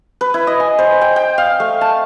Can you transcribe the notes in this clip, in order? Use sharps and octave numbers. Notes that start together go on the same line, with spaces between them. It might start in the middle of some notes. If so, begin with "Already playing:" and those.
B4
E4
D#5
G#5
C5
G5
G5
F5
A3
A5